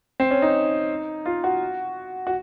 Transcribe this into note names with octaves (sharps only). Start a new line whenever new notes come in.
C4
C#4
D#4
F4
F#4
F#4